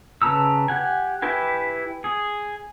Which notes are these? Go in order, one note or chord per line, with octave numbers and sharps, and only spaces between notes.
C#3 B4 A5 A#5 E6
G4 F#5 G#5
E4 G4 B4 G#5
G#4